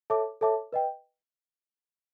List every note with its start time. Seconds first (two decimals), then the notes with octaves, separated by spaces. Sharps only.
0.10 A4 C#5 E5 A5 D6
0.41 A4 C#5 E5 A5 D6
0.73 B4 D#5 G5